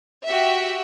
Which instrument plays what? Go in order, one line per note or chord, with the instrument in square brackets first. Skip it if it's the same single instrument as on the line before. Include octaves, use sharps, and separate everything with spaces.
[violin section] F#4 G4 E5